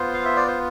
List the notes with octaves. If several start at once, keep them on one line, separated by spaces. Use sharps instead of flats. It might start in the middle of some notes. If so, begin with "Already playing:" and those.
Already playing: B3 F4 C5
F5
E5
D5
C5